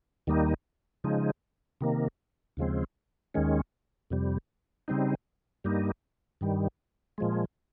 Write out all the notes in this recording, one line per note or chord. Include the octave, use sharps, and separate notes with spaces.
D#2 D#3 G3 A#3 D#4
C#3 F3 G#3 D#4
C3 D#3 A#3
D#2 C#3 F3 G#3 C4
D#2 D#3 G#3 C#4
F2 C3 G3
C#3 G3 C4 D#4
G2 G3 A#3 D#4
G2 D#3 G3
A#2 F3 G#3